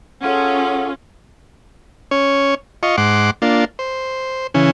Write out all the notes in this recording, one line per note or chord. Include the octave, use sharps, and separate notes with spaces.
C#4 F4 G#4 A4 F#5
C#4 C#5
F4 D#5 C#6
G#2 F#5 C6 D6
A#3 D4 F4
C5
C#3 E3 C#4